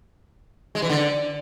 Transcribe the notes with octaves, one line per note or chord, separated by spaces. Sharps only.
G#3
E3
D3